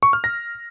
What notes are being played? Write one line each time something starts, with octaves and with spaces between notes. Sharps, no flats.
C#6
F6
A#6